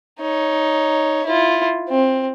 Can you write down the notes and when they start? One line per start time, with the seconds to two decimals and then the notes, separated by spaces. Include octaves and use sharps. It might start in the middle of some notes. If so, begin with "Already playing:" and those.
0.20 D#4 C#5
1.25 E4 F4
1.89 C4